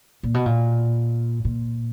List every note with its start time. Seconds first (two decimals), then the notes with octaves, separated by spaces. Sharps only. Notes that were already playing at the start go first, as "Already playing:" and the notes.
0.23 A#2
0.34 B2
0.46 A#2
1.45 A#2